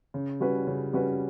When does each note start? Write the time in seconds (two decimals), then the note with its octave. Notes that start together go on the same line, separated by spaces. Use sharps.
0.14 C#3
0.40 G3 C#4 F#4 B4
0.67 C#3
0.93 G3 C#4 F#4 B4